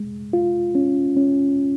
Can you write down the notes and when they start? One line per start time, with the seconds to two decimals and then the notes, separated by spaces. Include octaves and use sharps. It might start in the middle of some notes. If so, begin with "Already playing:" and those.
Already playing: G#3
0.33 F4
0.75 C#4
1.17 C#4